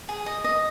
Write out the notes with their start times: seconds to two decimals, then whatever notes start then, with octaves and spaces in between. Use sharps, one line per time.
0.09 G#4
0.26 D#5
0.44 D#5